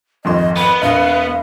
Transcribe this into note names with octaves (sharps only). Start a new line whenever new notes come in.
G#1 F2 D#5 C6
B3 B5
E1 D#5 F5